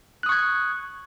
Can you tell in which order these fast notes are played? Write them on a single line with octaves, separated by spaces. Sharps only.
F#6 D#6 C#6 G#6